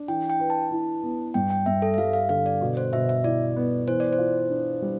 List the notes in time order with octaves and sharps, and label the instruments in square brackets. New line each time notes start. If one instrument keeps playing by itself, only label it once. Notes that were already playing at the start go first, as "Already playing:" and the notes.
Already playing: [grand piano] D4
[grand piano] E3 [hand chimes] G5
[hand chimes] G5
[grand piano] B4
[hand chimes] A5
[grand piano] E4
B3
[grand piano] G2 [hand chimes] G5
[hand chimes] G5
[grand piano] G2 [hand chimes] E5
[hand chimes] A4
E5
[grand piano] G3 [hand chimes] F5
[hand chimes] F5
[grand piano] D3 [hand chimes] F5
[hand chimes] D5
[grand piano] B2
[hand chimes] C5
[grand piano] B2 [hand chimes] E5
[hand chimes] E5
[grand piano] E4 [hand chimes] D5
[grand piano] B3
[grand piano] E3 [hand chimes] C5
[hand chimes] D5
C5
[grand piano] F4
D4
G3